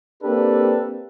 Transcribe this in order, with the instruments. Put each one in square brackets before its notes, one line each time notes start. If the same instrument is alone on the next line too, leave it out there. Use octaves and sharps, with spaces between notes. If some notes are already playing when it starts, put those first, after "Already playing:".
[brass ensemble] A#3 C4 D4 G4 A4 B4